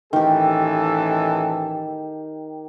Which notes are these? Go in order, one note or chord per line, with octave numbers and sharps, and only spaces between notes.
A1 D#3 E3 G4 A4